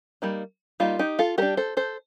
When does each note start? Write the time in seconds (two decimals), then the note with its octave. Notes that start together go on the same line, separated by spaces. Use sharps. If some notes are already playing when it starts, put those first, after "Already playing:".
0.22 G3 A#3 D#4
0.80 G3 A#3 D#4 F4
0.99 D#4 G4
1.19 F4 A4
1.38 G3 G4 A#4
1.42 D4
1.57 A4 C5
1.77 A4 C5